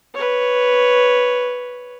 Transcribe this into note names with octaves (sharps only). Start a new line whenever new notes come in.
B4 C#5